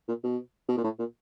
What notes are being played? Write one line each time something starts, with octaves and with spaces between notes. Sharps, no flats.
A#2
B2
B2
A#2
A2
A#2